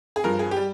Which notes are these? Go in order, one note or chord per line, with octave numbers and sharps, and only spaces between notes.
G#4
G2 F3 A#4
G#4
G4
G3